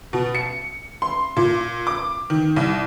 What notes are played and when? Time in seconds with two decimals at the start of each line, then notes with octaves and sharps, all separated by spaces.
0.13 B2
0.35 C#7
1.02 C6
1.36 A#2
1.87 D6
2.30 D#3
2.56 C2